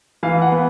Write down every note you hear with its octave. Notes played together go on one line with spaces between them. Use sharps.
E3 F5
F#5
B3